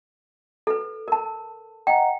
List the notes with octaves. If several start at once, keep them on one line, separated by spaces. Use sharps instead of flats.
A4 B4
A#4 A5
D#5 F#5 G5 A#5